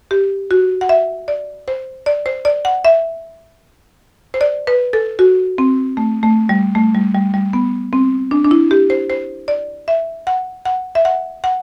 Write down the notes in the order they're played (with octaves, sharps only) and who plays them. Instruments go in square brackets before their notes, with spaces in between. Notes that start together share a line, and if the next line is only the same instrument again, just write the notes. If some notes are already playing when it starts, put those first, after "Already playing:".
[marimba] G4
F#4
F#5
E5
D5
C5
D5
C5
D5
F#5
E5
C5
D5
B4
A4
F#4
C4
A3
A3
G3
A3
G3
G3
G3
B3
C4
D4
D4
E4
G4
C5
C5
D5
E5
F#5
F#5
E5
F#5
F#5